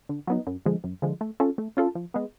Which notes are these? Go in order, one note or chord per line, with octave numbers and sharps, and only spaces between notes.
D3
F#3 B3 D#4
F#2
D3 F3 G#3
F#2
D3 F3 G#3
A3
C#4 F4 A4
A3
C#4 F4 A4
F3
G#3 B3